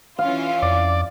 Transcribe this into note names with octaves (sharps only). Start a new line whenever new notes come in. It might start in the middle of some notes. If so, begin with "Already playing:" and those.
E3 C#4 F4 F5
F2 D5